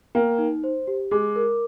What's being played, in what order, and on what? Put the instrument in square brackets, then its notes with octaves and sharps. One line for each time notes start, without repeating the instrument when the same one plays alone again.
[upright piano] A#3 [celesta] G5
[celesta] D#4
C5
G4
[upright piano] G#3 [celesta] D6
[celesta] A#4